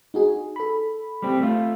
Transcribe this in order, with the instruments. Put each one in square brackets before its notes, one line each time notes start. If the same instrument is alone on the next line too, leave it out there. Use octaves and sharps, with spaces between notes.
[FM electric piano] D#4 F#4 G#4
A4 B5
[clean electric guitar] G3 C4
A3 F4